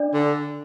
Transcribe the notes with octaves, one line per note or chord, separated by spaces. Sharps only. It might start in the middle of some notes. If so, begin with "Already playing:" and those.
Already playing: D4 D5
D3